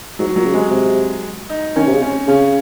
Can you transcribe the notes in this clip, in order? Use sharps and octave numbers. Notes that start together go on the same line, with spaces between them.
G#2 F#3
A#2 F#3
C#3
C3 G#3
C3
D#4
D#3 C#4
C3
C#3
C#4
C#3 C#4